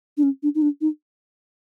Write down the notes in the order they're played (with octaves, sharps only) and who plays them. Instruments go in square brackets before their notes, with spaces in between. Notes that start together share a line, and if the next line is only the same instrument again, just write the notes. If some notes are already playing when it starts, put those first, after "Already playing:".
[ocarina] D4
C#4
D4
D#4
D4
D#4